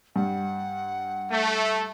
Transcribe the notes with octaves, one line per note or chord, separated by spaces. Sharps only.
G2 G3 F#5
A3